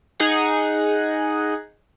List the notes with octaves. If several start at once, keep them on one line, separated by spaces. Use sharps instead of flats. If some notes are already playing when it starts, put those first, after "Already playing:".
D#4 G#4 F#5